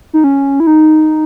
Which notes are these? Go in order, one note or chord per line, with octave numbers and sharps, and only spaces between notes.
D#4
C#4
E4
D#4